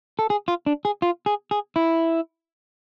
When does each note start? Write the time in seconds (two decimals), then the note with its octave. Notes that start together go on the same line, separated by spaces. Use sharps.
0.19 A4
0.30 G#4
0.48 F4
0.66 D4
0.85 G#4
1.02 F4
1.26 G#4
1.51 G#4
1.76 E4